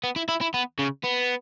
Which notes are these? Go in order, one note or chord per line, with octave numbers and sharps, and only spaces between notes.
B3
E4
E4
E4
B3
C#3
B3